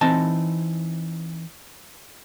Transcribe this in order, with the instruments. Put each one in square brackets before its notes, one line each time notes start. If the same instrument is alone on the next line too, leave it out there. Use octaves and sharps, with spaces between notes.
[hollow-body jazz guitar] E3 C4 D#4 A5